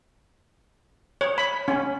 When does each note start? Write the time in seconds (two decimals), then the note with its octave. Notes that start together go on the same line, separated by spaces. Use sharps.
1.21 C#5
1.38 B5
1.68 C#4